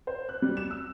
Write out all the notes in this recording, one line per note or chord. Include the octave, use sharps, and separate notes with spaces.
C5
F#6
G3
E7
E6